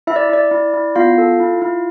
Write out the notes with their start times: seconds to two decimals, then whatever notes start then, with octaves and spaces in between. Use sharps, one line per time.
0.07 E4 E5
0.16 D5
0.29 E4 D5
0.51 E4
0.74 E4
0.96 B3 F4 F5
1.18 A4
1.40 E4
1.62 E4